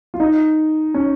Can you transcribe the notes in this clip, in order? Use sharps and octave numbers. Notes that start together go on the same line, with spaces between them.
F4
D#4
C#4